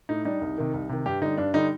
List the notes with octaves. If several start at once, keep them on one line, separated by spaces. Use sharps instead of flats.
A2 D#4
G3 D4 D#4
C2
C3 D#3
C2
C3 D#3
G2 G4
D3 G3 D#4
G2 D4
D3 G3 D#4